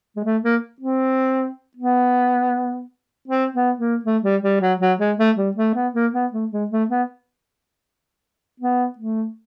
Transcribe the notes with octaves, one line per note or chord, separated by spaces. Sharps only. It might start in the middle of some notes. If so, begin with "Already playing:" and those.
G#3
A3
A#3
C4
B3
C4
B3
A#3
A3
G3
G3
F#3
F#3
G#3
A3
G3
A3
B3
A#3
B3
A3
G#3
A3
B3
B3
A3